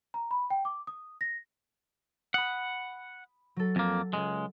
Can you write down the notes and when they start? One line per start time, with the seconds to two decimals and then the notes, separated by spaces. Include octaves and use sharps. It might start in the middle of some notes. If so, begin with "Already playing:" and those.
0.14 A#5
0.31 B5
0.50 G5
0.65 D6
0.87 D#6
1.21 A#6
2.34 F#5 B5 D#6
3.56 F#3 A4
3.76 F2 A#3
4.13 C#2 F#2 G#3